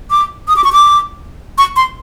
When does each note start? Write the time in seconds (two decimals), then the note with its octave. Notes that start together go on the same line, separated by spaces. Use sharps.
0.10 D6
0.48 D#6
0.56 D6
0.64 C#6
0.73 D6
1.58 C#6
1.76 C6